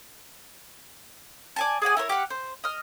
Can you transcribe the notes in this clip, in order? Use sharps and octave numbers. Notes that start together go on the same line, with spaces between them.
D5 G#5 A5
G#4 D5 F#5 G#5
E4 A#4 C5 C#5
G4 F5 F#5
C5
D#5 F6